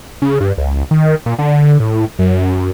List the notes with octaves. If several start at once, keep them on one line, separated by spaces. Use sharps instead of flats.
C#3
G2
C#2
D#3
A#2
D3
A2
F#2